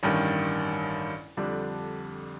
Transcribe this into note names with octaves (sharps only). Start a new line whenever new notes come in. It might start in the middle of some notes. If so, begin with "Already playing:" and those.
A1 G2 D#3
F2 D3 G3 D4